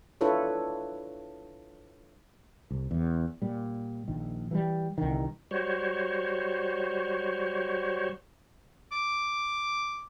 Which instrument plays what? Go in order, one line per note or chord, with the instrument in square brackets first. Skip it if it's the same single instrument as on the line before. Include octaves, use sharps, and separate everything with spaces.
[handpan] D4 E4 F4 A4 B4 C#5
[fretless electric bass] C2
E2
A#2 G3
A#1 D#3
E3 F#3 G3
C2 D3 D#3
[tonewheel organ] G3 F#4 C5 C#5
[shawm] D6